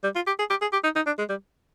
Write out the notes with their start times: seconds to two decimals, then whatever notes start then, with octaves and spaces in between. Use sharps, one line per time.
0.04 G3
0.16 F4
0.27 G4
0.39 G#4
0.50 G4
0.61 G#4
0.73 G4
0.84 D#4
0.96 D#4
1.06 D4
1.19 G#3
1.29 G3